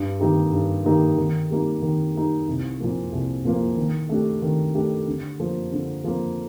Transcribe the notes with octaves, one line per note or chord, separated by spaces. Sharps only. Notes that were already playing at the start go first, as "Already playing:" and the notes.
Already playing: G2
D#3 A#3 D#4 G4
G2
D#3 A#3 D#4 G4
D#3
G3 A#3 D#4
D#3
G3 A#3 D#4
C2
A#2 F3 A#3
C2
A#2 F3 A#3
D#3
A3 D4 G4
D#3
A3 D4 G4
D3
F3 A#3
D3
F3 A#3